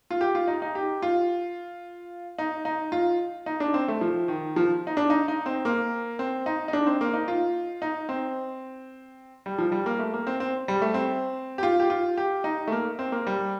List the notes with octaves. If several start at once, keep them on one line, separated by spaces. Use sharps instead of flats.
F4
G4
F4
D#4
D#4
G4
F4
D#4
D#4
F4
D#4
D4
C4
A3
F3
D#3
F3
D#4
D4
D#4
D#4
C4
A#3
C4
D#4
D#4
D4
C4
A#3
D#4
F4
D#4
C4
G3
F3
G3
A#3
A3
A#3
C4
C4
G3
A3
C4
G4
F4
G4
F4
G4
D#4
A3
A#3
C4
A#3
G3